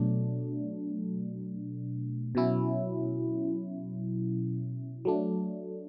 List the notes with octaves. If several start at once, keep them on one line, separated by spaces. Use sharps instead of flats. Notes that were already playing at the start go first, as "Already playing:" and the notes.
Already playing: B2 F#3 A3 D4
B2 F#3 C#4 E4
F#3 A3 D4